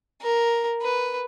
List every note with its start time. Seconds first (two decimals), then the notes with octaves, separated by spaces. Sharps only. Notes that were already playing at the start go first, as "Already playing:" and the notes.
0.22 A#4
0.82 B4